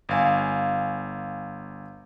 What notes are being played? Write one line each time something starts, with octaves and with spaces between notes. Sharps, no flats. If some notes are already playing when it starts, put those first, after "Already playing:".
G1 F5 G#5